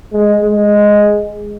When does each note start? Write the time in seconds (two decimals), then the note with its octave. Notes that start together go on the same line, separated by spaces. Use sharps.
0.13 G#3
0.43 G#3